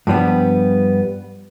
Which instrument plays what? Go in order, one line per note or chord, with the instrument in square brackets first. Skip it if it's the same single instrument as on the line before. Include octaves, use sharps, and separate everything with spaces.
[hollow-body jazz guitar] G2 F3 G3 B3